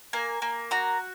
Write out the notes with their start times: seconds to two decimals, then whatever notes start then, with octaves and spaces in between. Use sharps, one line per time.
0.13 A#3 G#5
0.42 A#3
0.71 F#4 A#5